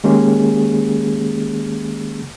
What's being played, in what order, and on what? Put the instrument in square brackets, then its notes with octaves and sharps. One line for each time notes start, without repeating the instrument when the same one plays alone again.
[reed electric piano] D#3 G#3 A#3 C#4 G4 G#4